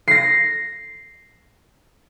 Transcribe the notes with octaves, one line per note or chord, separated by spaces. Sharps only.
A#6 C7